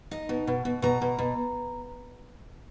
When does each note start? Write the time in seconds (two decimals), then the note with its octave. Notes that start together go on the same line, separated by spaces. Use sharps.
0.11 D#4
0.29 B2
0.47 B2
0.65 B2
0.82 B2 A#5
1.01 B2
1.19 B2